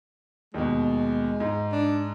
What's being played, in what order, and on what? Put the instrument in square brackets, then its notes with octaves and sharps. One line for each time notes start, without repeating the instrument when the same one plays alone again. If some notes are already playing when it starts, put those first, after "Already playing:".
[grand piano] D#2 B2 [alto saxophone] G#3
[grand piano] G#2
[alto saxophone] D4